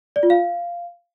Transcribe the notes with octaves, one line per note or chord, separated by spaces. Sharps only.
D5
F4
F5